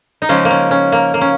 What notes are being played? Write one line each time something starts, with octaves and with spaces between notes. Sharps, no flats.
D#4
C#3 F3 G#3 C#4
A#3
C#4
C#4
A#3
A#3
C#4